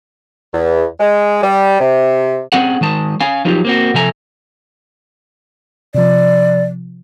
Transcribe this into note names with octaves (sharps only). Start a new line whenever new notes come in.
E2
G#3
G3
C3
C4 C#4 G#4 F#5
D#3 G#3 A5
C#4 F5 G#5
F3 F#3 D#4 F4 G4
A#3 C4 F#4
C3 F3 A4 E5 G#5 A#5
C3 F3 D5